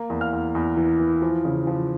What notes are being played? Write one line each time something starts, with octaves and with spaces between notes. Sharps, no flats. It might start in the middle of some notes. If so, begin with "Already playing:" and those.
Already playing: A#3
E2
F5 F6
E2
E2
E3
E3
F3
C#3
F3